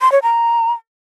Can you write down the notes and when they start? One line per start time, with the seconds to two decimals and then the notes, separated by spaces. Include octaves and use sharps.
0.01 C6
0.12 C#5
0.23 A#5